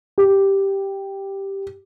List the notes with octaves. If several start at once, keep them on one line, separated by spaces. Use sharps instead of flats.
G4